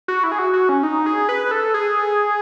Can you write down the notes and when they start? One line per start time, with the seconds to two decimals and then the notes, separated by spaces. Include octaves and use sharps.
0.08 F#4
0.24 E4
0.32 G#4
0.39 F#4
0.53 F#4
0.69 C#4
0.83 D#4
1.06 G#4
1.29 B4
1.51 A4
1.74 G#4